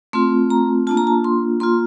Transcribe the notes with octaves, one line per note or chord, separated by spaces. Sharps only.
A3 C4 F4 C6
A#5
A#3 D4 F4 A5
A#5
A5
C6
A#3 F4 C6